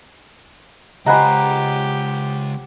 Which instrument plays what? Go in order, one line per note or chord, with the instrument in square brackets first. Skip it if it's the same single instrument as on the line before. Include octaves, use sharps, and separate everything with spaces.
[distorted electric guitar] C#2 [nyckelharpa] G4 [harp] C5 F#5 A#5 [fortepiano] D#5 G#5 B5